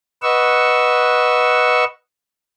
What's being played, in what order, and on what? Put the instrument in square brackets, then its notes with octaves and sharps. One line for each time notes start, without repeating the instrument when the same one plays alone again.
[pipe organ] B4 D#5 F#5 C#6 E6